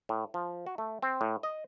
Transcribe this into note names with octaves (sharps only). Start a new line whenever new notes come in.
A2
F3
F#4
A3
C4
A2
D#5